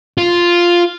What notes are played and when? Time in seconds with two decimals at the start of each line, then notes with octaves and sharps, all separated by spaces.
0.18 F4